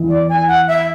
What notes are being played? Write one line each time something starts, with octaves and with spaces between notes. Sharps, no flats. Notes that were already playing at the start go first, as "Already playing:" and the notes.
Already playing: E3
D5
G#5
F#5
E5